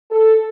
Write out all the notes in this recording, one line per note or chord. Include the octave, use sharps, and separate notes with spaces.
A4